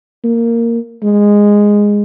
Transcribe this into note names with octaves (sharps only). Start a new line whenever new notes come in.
A#3
G#3